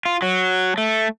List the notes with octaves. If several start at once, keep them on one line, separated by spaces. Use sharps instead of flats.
F4
F#3
A3